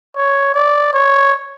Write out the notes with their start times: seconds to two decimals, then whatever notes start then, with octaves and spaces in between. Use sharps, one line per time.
0.16 C#5
0.54 D5
0.94 C#5